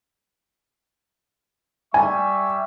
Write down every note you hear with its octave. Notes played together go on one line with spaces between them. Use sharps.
G3 E5 G#5 C#6